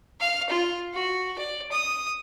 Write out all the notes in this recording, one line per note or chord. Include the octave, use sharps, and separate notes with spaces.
F5
F4
F#4
D5
D#6